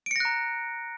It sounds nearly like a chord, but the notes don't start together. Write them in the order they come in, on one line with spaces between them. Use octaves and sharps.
D7 C#7 A#6 F#6 A#5